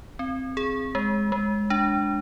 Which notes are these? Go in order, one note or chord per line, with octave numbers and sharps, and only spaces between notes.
C4
G#4
G#3
G#3
D4